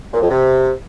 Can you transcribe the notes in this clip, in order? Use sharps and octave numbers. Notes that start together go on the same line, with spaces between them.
A#2
F2
C3